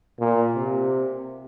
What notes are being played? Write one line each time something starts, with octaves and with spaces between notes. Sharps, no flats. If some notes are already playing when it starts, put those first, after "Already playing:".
A#2
C3